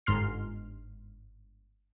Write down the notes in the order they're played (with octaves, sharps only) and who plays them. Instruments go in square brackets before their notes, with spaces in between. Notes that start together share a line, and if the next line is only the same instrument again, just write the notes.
[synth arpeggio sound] G1 G#2 C6 F6 C7